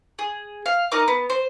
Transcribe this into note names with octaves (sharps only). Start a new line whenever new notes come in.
G#4
F5
D#4 A#4 D#5 D6
B3
C5